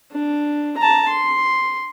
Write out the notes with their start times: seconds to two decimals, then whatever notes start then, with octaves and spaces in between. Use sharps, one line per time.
0.12 D4
0.77 A5 A#5
1.09 C6